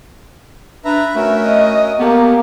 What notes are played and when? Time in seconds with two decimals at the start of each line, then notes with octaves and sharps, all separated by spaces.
0.85 D4 B4 E5 A#5
1.15 A3 C#4 F#4 A#4 E5
1.48 D#5
1.99 A#3 B3 G4 A4